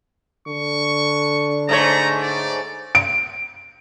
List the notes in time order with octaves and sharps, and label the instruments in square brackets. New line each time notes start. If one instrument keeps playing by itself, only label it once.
[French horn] D3 [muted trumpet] C#6
[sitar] G#2 A3 C#5 [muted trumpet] A#5
[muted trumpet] D5
[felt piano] D7